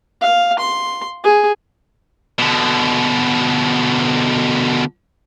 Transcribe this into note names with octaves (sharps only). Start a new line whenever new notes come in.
F5
C6
G#4
B2 D3